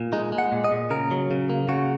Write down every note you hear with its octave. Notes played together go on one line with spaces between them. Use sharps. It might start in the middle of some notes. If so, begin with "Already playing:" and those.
Already playing: A#2
G#3 D#4
G#3
F#5
A#2
D#5
A#2
C#3 A#4
F#3
C#3
A#3
C#3 F#4